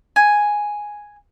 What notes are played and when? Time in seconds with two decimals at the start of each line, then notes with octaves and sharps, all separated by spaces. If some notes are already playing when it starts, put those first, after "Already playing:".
0.16 G#5